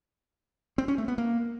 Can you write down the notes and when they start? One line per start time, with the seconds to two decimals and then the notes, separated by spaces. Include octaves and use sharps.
0.78 C4
0.88 C#4
0.98 A3
1.08 B3
1.18 A#3